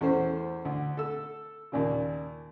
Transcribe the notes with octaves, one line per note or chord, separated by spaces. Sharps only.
E2 A3 C#4 C5
D2
A4 E6
D#2 A#2 C#3